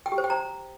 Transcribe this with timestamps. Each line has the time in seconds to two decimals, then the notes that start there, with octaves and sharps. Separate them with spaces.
0.06 G5
0.12 G4
0.18 C5
0.24 G5
0.30 A#5